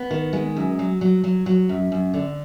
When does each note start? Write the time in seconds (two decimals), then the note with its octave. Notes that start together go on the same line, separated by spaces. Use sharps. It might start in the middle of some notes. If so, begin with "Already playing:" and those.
Already playing: B3
0.11 D#3
0.33 G#3
0.56 F#2
0.79 F#3
1.01 F#3
1.24 F#3
1.46 F#3
1.69 F#2
1.92 F#2
2.14 D3